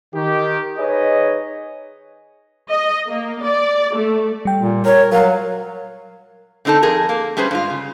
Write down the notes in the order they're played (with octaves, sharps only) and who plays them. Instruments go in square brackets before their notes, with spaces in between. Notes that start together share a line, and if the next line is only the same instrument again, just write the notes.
[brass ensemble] D#3 G4
D#4 G#4 B4 C#5 D#5
[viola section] D#5
A#3
D5
A3
[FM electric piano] G3 G5
[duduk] A#2
[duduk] A#4 [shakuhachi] C#5
[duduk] F#3 [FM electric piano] A#4 [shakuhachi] F5
[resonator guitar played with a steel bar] D3 C4 D#4 G#4 A4
F2 G#4 A#4
A#3
G3 A3 C#4 G#4 B4 C5
G2 G#3 F4
C#3